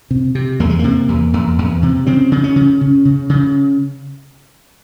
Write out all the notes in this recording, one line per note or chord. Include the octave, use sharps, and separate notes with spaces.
C3
C3
E2 A#3
G#3
C3 A#3
E2
E2
E2
C3
C#3 C4
C#3
C#4
C#3
C#3
C#3
C#3